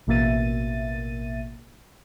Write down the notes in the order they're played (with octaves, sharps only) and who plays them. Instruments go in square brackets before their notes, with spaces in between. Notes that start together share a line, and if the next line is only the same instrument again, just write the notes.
[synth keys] A1 B2 A#3 E5 A6 D#7